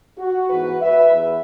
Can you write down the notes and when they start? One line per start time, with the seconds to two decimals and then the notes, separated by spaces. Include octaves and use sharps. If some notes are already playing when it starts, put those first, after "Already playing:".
0.18 F#4
0.50 G#2 E3 B3 F#4 B4
0.82 B4 E5
1.13 E2